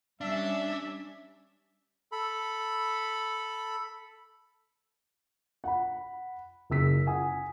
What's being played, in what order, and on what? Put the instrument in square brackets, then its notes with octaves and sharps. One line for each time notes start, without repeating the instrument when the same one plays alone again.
[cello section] G3 C#4 [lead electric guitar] D4 [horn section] E5
[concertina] A4 B5
[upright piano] F#5 B5
F#1 C#3 E6 B6
F#5 G#5 D#6